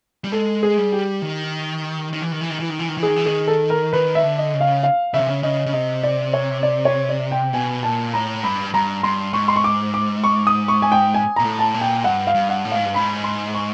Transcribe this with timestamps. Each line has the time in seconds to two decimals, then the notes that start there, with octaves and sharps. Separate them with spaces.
0.24 G3
0.32 G#3 A4
0.63 G#4
0.78 G3
0.92 G4
1.22 D#3
2.13 D#3
2.22 E3
2.32 D#3
2.41 E3
2.50 D#3
2.60 E3
2.70 D#3
2.79 E3
2.88 D#3
2.97 E3
3.03 D#3 G#4
3.16 E3
3.26 D#3 G#4
3.47 A4
3.70 A#4
3.93 D#3 B4
4.15 E5
4.23 D3
4.38 D#5
4.54 C#3
4.60 F5
4.83 F5
5.14 C#3 E5
5.20 C3
5.27 C#3
5.43 C#3 D#5
5.66 C#3
5.73 C3 D#5
6.03 D5
6.34 C#5
6.63 D5
6.85 C#5
7.09 D5
7.31 G5
7.53 B2 G#5
7.83 A#2 A5
8.13 A2 A#5
8.43 G2 B5
8.74 G2 A#5
9.03 G2 C6
9.33 G#2 C#6
9.48 C6
9.56 C#6
9.64 D6
9.94 D6
10.24 C#6
10.47 D#6
10.68 C#6
10.82 G#5
10.92 G5
11.14 G#5
11.36 A#2 A#5
11.44 A2
11.59 A5
11.74 A#2
11.81 G5
12.04 G2 F#5
12.27 F5
12.34 G2
12.49 F#5
12.65 A2
12.72 G#2 F5
12.85 G2
12.94 G#2 B5
13.24 C6
13.54 C#6